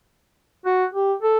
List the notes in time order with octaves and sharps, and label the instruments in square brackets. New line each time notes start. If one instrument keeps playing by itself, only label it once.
[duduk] F#4
G4
A4